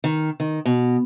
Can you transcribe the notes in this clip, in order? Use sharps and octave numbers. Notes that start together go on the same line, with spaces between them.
D#3
D#3
B2